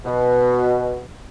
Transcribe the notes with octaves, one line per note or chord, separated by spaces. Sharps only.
B2